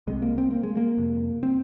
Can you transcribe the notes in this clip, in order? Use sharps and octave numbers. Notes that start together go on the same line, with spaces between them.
C2 C3 G#3
A#3
C4
A#3
G#3
A#3
F2 C3
C4